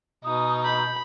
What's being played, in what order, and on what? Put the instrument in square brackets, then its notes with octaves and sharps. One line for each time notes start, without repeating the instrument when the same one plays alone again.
[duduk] B2 [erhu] D#4 [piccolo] D#6
[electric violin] B5 [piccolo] G6